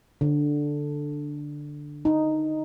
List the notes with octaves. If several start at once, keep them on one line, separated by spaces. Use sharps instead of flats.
D3
D#4